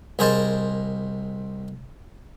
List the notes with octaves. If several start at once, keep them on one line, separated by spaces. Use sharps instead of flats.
C2 G#4 A#4 C5 D#5 A5